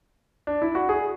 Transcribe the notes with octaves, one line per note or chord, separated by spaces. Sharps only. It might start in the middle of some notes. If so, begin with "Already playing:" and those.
D4
E4
F#4
G#4